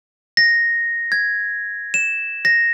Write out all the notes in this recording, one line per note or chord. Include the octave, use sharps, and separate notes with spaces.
A#6
G#6
E7
A#6